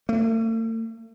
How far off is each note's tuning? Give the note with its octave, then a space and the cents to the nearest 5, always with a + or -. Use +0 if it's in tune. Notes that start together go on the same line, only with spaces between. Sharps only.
A3 +45